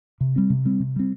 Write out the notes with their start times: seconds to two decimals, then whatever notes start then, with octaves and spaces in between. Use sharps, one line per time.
0.21 C3
0.36 G3 C4
0.50 C3
0.66 G3 C4
0.80 C3
0.96 G3 C4